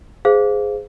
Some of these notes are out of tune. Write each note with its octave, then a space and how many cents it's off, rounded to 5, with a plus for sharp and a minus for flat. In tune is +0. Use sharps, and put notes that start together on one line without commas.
G#4 +0 C5 -20 F5 +0